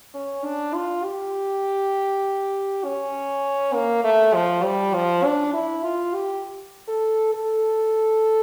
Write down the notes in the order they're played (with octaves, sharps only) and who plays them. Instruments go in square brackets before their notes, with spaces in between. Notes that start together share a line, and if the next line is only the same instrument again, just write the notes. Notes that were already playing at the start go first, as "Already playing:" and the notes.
[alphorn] C#4
D4
F4
G4
C#4
A#3
A3
F3
G3
F3
D4
E4
F4
G4
A4
A4